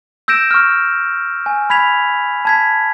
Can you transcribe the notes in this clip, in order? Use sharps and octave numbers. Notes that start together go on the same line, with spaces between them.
E6 G6 A#6 D7 E7
C#6 F6
G#5
B5 G#6 B6 F7
A5 G#6 B6